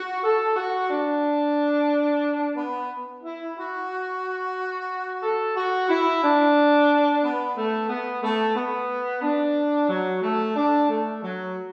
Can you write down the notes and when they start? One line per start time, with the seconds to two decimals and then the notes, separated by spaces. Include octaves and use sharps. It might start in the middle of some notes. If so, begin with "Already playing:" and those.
Already playing: F#4
0.24 A4
0.56 F#4
0.90 D4
2.56 B3
3.23 E4
3.57 F#4
5.23 A4
5.57 F#4
5.90 E4
6.23 D4
7.22 B3
7.57 A3
7.89 B3
8.23 A3
8.56 B3
9.22 D4
9.89 F#3
10.22 A3
10.56 D4
10.89 A3
11.23 F#3